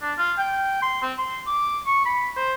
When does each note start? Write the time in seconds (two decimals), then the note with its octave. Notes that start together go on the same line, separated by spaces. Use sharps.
0.02 D4
0.18 F4
0.38 G5
0.82 C6
1.02 C4
1.18 C6
1.47 D6
1.86 C#6
2.05 B5
2.36 C5